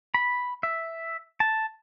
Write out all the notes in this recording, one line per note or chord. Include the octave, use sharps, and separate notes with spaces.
B5
E5
A5